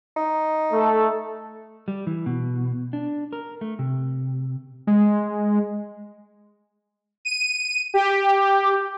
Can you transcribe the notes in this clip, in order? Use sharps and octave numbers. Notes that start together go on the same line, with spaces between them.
D#4
A3 A4
G3
E3
B2
D4
A#4
A3
C3
G#3
D#7
G4